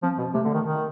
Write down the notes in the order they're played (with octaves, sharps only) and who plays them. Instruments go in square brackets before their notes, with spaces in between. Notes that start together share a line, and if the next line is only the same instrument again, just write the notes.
[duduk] F3 [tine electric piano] C4
[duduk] B2 [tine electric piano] C4
[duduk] C3 [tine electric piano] A3
[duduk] D3
D#3
D#3